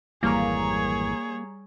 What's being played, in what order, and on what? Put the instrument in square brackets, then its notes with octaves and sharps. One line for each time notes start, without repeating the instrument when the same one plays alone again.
[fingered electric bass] G#1 F2 E3 [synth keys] G3 A#5 [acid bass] A#3 [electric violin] G#4 C#5